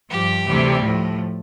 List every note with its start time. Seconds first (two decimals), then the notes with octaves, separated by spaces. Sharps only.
0.10 G2 F3 G4
0.45 D2 C3 E3 G3
0.82 A2 F3